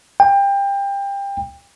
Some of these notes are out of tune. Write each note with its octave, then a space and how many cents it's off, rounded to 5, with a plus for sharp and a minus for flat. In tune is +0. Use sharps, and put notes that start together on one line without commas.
G5 +25